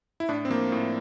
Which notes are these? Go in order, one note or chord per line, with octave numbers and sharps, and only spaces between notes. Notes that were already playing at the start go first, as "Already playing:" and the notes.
E4
A2 D4
C4
F3 A#3
A2